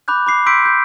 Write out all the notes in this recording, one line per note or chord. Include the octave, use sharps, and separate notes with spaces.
B5 D6 F#6 G6
B5 D6 C7
C6 D6 E6 G6 B6 D7
G6